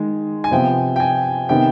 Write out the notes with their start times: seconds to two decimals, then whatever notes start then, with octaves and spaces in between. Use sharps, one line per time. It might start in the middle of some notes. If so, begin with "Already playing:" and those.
Already playing: D#3 G#3
0.44 G#5
0.51 C3 F3 B3 G5
0.96 G5
1.00 G#5
1.49 C3 D#3 B3 G5